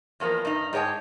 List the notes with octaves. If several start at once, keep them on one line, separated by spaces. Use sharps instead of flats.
E2 F3 A#3 B3 C5
G2 D#4
G#2 G#4 C#5 G5 A5